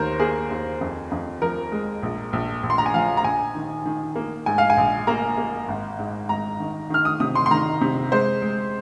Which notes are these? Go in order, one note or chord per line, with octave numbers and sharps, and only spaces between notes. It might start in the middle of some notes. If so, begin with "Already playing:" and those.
Already playing: D#2 D#3 A#4 C5
A#3 G#4
D#2
F2
F2
F3 A#4
G#3
A#1
A#1
A#1
C6
A#5
G#5
F3 F5
A#5
A#1 G#5
D#3
D#3
A#3
G#2 G#5
F5
G#5
A#1
A#3 A#5
A#3
G#1
G#2
G#1 A#5
D#3
D#3 F6
D#6
C3 D#6
C6
C6
D#3 A#5
C3
G#3 C5
G#3